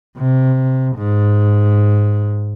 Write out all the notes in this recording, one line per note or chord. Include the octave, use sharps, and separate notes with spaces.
C3
G#2